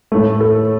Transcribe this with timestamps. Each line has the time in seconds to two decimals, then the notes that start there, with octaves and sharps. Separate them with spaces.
0.12 A2 A3
0.41 A4